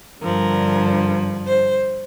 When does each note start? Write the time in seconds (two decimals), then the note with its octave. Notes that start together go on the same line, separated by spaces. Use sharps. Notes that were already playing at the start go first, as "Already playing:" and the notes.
0.22 G2 D3 F3 A#4
1.46 C5